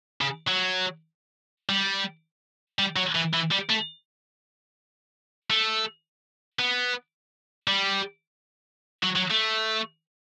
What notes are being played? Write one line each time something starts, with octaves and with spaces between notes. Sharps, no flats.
C#3
F#3
G3
G3
F#3
E3
E3
G3
A3
A3
B3
G3
F#3
F#3
A3